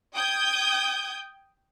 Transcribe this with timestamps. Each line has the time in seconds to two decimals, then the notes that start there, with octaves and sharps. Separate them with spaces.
0.13 G5 D#6 G6 G#6